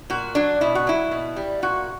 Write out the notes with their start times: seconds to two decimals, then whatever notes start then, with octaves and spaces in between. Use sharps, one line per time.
0.10 A#2 F#4
0.35 F#3 D4
0.61 B2 E4
0.75 F#4
0.87 F#3 E4
1.11 B2
1.36 G3
1.62 A#2 F#4